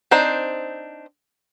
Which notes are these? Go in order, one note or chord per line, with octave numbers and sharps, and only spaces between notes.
C4 D4 D#4 C5